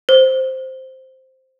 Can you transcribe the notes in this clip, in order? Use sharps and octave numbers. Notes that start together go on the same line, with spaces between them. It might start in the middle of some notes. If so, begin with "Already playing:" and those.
C5